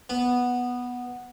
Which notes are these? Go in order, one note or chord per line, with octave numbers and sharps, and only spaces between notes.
B3